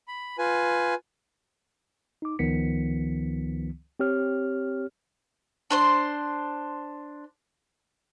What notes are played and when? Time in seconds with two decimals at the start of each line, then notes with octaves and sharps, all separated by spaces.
0.08 B5
0.38 F4 B4 G#5
2.22 D#4 D6
2.39 C#2 D#3 F3 B3 B6 C#7
4.00 C4 G4 C#5 F6
5.70 D4 C5 C6